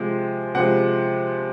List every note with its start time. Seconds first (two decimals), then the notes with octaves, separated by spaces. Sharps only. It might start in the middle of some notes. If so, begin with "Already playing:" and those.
Already playing: C3 F3 G#3
0.55 C3 F3 G#3 F#5